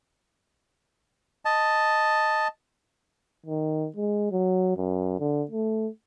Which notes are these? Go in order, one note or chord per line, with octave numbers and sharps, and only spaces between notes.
D#5 A5
D#3
G#3
F#3
F#2
D3
A3